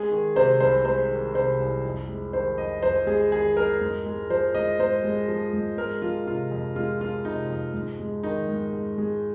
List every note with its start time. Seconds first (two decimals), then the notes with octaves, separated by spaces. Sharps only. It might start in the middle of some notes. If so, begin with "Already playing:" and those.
Already playing: G#3 G#4
0.11 D#3
0.36 C3 C5
0.60 C2 C5
0.85 G#3 C5
1.10 D#3
1.34 C3 C5
1.60 C2
1.85 F2
2.09 G#3
2.33 D#3 C5
2.58 F2 D#5
2.82 F2 C5
3.06 G#3 G#4
3.31 D#3 G#4
3.57 F2 A#4
3.81 G#2
4.06 G#3
4.30 F3 C5
4.55 G#2 D#5
4.79 G#2 C5
5.04 G#3
5.28 F3
5.53 G#2
5.78 G#3 A#4
6.02 F3 F4
6.26 C3 F4
6.51 F2
6.75 G#3 F4
7.01 F3 F4
7.25 C3 D#4
7.50 F2
7.74 G#2
7.99 G#3
8.23 D#3 D#4
8.48 G#2
8.73 G#2
8.98 G#3